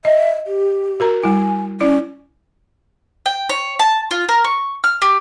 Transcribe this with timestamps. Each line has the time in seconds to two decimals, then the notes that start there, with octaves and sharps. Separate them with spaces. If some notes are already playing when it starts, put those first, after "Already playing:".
0.05 D#5 E5
0.47 G4
1.00 F#4 A#4 A#5
1.23 G3 E4 G#5
1.80 C#4 E4 D5
3.26 G5
3.49 C#5
3.79 A5
4.11 F4
4.29 A#4
4.44 C#6
4.84 F6
5.02 G4